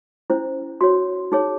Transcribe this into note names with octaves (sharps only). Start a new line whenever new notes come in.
C#4 E4 C5
F#4 C#5 C6
D#4 G#4 C#5